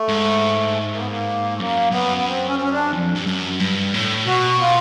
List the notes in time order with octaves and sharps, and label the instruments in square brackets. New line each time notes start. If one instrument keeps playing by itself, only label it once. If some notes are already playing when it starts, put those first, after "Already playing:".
Already playing: [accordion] A3
[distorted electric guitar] G#2
[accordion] A#3
B3
A#3
A3
[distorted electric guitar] F#2 [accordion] A#3
[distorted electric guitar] F#2 [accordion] B3
[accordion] B3
C4
C#4
C4
C#4
D4
[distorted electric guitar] F2
G2
F#2
G2
A2
[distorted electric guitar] B2 [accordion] F#4
[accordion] F4